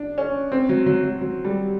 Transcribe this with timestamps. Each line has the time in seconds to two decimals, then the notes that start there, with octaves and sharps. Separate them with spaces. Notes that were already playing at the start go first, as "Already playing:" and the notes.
Already playing: D4
0.18 C#4
0.52 C4
0.69 F#3
0.86 F#3
1.04 F#3
1.21 F#3
1.45 G3